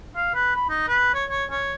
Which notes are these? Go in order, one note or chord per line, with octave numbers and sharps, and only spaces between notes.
F5
B4
B5
D#4
B4
C#5
C#5
C#5